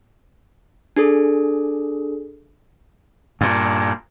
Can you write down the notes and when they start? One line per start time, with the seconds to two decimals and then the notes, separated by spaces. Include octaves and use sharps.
0.96 D4 G#4 A4
3.41 G2 A#2